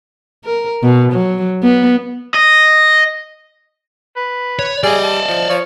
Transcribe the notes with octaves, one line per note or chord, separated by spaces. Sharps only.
A#4
B2
F#3
B3
D#5
B4
C#5
G3 G#4 D5 D#5
A5
F3
F3 C#5